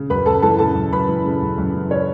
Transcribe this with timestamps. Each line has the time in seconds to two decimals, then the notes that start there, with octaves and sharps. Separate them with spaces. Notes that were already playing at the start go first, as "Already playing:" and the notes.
Already playing: C#3
0.10 F#2 B4 B5
0.26 F#2 A4 A5
0.42 E3 A4 A5
0.59 C#3 A4 A5
0.75 F#2
0.92 F#2 B4 B5
1.09 E3
1.26 C#3
1.42 F#2
1.58 F#2
1.74 E3
1.91 C#3 C#4 C#5